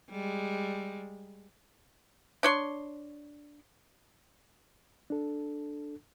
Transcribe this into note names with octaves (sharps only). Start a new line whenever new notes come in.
G3 G#3
D4 C#5 C6
D4 A4